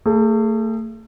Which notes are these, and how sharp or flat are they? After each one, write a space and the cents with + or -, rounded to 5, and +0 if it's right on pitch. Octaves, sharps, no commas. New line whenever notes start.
A3 +35 G#4 +0